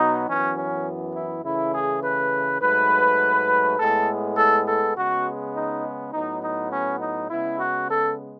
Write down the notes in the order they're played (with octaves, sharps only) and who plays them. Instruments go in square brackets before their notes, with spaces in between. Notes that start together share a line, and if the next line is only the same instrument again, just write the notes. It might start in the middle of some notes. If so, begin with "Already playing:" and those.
Already playing: [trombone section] B2 F#3 B3 D#4
F#2 E3 B3 C#4
C#4
E4
C#3 E3 A3 E4
G#4
B4
G#2 F#3 A3 B4
A2 G#3 B3 A4
A4
A4
C#3 G#3 B3 F#4
D#4
A2 F#3 B3 D#4
D#4
C#4
D#4
C#3 G#3 B3 E4
F#4
A4